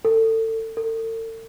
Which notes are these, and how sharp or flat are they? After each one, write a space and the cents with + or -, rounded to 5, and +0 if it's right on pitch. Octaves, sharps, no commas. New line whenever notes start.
A4 +30
A4 +40